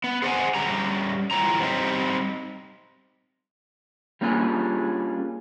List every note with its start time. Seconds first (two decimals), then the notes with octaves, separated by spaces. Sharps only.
0.04 B3
0.22 G#4 C5 D5 D#5 F#5 G#5
0.55 G3 C#4 G4 A#5
1.31 E3 F4 C#5 G5 A#5
1.60 G3 C4 D#4 G4
4.21 G3 A#3 C#4 D4 F4 G#4